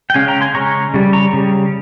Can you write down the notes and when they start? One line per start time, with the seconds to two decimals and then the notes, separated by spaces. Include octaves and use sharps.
0.10 G5
0.14 C#3 G#3 C#4 F5 G#5
0.28 G5 A#5
0.41 G#5 C6
0.54 C#3 G#3 C#4 A#5 C#6
0.94 C#3 G3
1.13 A#5 C#6
1.33 C#3 G3